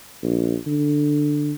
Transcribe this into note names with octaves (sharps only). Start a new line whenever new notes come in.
A#1
D3